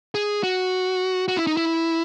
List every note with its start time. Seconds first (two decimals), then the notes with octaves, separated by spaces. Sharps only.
0.15 G#4
0.43 F#4
1.28 F#4
1.37 E4
1.47 D#4
1.57 E4